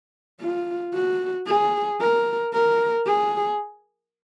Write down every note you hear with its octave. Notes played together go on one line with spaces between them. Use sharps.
F4
F#4
G#4
A#4
A#4
G#4